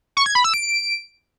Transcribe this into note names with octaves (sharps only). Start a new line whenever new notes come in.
C#6
G#6
B5
E6
D7